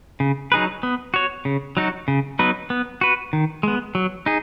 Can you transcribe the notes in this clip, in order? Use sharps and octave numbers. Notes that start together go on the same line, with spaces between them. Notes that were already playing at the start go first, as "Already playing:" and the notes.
C#3
F#3 D#4 G#4 B4
B3
F#4 C#5
C#3
F#3 D#4 F#4
C#3
F#3 B3 D#4 B4
B3
F#4 B4
D#3
G#3 B3
F#3
D#4 G#4